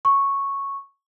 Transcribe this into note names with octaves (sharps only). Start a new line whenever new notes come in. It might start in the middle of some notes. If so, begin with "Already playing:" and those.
C#6